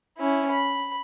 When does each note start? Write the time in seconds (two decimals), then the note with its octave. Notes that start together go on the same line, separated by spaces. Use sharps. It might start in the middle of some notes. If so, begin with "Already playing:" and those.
0.17 C#4 E4
0.51 B5